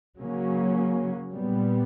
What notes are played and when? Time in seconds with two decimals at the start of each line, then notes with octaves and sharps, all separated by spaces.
0.19 C#3 F#3 A#3 C#4
1.33 A#2 G3 B3